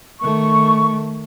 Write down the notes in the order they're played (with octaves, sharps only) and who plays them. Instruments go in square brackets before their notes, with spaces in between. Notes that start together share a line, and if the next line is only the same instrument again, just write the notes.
[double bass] D#3 A3 [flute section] C#6